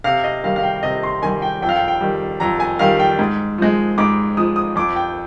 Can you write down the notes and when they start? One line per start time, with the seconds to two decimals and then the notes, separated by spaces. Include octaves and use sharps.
0.04 C3 F5
0.24 D#5
0.44 D#3 G3 F5
0.56 F5
0.63 G5
0.83 C3 D#5
1.03 C6
1.22 D#3 G3 G#5
1.42 G5
1.62 F2 G5
1.69 F5
1.76 G5
1.88 G5
2.01 D#3 G3
2.40 F2 A#5
2.60 G#5
2.79 D#3 G3 F5
3.00 G5
3.19 G#2
3.58 F3 G#3
3.98 G#2 D6
4.37 F3 G#3 D#6
4.56 D#6
4.76 F2 D6
4.96 G5